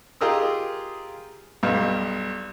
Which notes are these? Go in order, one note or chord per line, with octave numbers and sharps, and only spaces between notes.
F4 G4 G#4 A#4 D#5 E6
B1 G2 F5